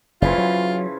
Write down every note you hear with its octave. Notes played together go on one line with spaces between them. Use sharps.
F#1 C#3 E3 F3 F4
F#3